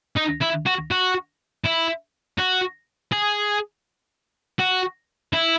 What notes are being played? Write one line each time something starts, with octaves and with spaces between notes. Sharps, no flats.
D#4
E4
F#4
F#4
E4
F#4
G#4
F#4
E4